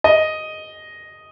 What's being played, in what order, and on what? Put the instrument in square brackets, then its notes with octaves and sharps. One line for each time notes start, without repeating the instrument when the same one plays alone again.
[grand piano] D#5